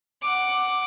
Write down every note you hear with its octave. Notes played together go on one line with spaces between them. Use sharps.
F#5 D6